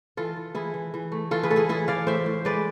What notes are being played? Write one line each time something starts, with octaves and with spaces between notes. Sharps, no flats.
E3 F4 A4
E3
E3 E4 G#4
E3
E3
A3
E3 F4 A4
G#4 B4
A2 A4
E4 G#4
E3 E4 G#4
E3 D5 F5
A2 C5 E5
A2
G#3 B4 D5